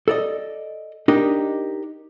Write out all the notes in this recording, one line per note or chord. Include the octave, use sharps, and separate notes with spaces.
A4 D5 D#5
D4 D#4 G4 A#4 D#5